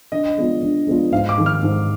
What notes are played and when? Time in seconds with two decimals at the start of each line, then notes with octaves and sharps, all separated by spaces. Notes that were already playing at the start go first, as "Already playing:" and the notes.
0.12 D3 D#5
0.37 G#3 B3 D4 F4
0.62 D3
0.87 G#3 B3 D4 F4
1.12 G#2 F5
1.29 D6
1.37 D#3 G#3
1.46 F6
1.62 G#2